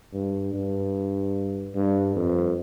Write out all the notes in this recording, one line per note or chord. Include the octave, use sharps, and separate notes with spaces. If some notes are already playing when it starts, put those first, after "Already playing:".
G2
G2
G2
F2